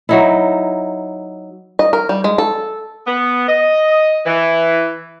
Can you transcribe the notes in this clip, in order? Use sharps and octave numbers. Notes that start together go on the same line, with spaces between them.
F#3 D#4 E4
D#5
A#4
G3
G#3
A4
B3
D#5
E3